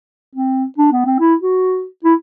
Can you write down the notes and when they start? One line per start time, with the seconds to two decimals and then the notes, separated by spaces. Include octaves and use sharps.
0.35 C4
0.78 D4
0.92 B3
1.06 C4
1.20 E4
1.41 F#4
2.04 E4